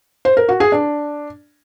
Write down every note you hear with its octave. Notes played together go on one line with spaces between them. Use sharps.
C5
A#4
F#4
G#4
D4